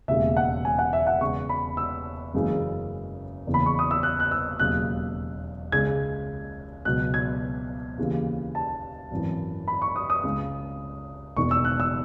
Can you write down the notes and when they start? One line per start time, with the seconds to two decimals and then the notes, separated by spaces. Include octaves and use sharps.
0.08 E1 D#2 C#3 G#3 E5
0.37 F#5
0.65 G#5
0.79 F#5
0.93 E5
1.07 F#5
1.21 E2 C#3 G#3 C#6
1.49 B5
1.77 E6
2.33 F#1 F#2 C#3 E3 G#3
3.47 F#1 E2 C#3 E3
3.54 B5
3.66 C#6
3.79 D#6
3.91 E6
4.03 F#6
4.20 F#6
4.31 E6
4.59 E1 D#2 C#3 F#3 F#6
5.72 C#2 C#3 G#3 G#6
6.85 C#2 B2 F#3 F#6
7.14 G#6
7.98 D#2 C#3 E3
8.55 A5
9.11 G#1 F#2 E3
9.68 B5
9.82 C#6
9.96 D#6
10.10 D#6
10.24 C#2 C#3 G#3
11.37 E1 E2 D#3 C#6
11.51 E6
11.65 F#6
11.80 E6